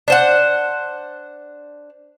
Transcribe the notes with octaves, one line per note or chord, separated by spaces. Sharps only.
D4 C5 F#5